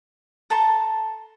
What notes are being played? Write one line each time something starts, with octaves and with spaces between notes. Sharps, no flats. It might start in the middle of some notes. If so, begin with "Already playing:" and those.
A4 A5 A#5 C6